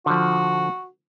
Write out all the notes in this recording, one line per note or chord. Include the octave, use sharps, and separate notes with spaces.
D3 F3 F#4